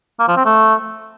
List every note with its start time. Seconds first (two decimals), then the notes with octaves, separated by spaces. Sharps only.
0.19 A#3
0.28 F3
0.37 C4
0.45 A3